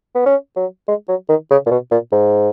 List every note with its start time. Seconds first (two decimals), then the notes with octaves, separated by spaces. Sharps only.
0.15 B3
0.26 C#4
0.56 F#3
0.88 G#3
1.09 F#3
1.29 D#3
1.51 C#3
1.66 A#2
1.71 B2
1.91 A#2
2.12 G#2